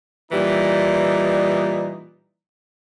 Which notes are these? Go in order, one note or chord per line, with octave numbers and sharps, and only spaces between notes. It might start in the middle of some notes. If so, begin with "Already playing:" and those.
A#2 E3 G3 D#4